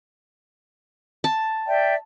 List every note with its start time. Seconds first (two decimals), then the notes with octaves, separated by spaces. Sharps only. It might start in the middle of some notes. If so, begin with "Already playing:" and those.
1.24 A5
1.67 D5 E5 G5